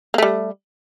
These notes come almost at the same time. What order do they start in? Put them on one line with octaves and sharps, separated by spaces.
A#3 A3 G3